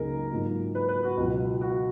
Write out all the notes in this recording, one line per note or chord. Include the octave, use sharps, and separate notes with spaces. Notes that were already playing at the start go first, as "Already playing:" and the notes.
Already playing: C#2 C#3 F#3 A#3 D#4 G#4 A#4
G#2 F#3 A#3 F4
B4
B4
F#4
C#2 B2 F#3
F#4